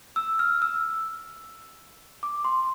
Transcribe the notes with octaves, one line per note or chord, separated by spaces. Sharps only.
E6
F6
E6
D6
C6